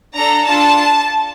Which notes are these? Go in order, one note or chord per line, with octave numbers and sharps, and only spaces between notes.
D4 A4 A#5
D4 F4 A4 A5